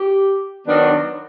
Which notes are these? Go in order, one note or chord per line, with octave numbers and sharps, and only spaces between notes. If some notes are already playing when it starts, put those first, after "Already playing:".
Already playing: G4
D#3 F#3 B3 D4